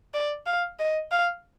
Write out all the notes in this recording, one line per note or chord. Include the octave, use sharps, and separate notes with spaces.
D5
F5
D#5
F5